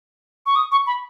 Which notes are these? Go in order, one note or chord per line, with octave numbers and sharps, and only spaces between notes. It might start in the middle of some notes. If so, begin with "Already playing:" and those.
C#6
D#6
C#6
B5